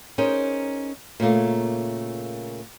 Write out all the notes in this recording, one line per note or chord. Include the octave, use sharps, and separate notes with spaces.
C#4 D#4 G#4 A#4 C5
A#2 C#3 A3 A#3